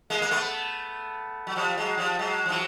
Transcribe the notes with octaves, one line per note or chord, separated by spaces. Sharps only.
G#3 A#3
A#3
A3 B3
F#3
F3 G3
F#3 G#3
F3 G3
F#3 G#3
F3
E3 F#3